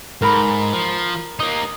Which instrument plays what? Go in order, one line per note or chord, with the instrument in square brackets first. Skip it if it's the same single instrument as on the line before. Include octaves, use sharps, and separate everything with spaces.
[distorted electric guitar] G#2 [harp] A#4 A#5 B5
[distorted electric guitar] F3
[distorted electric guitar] A#3 D#4 [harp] D#6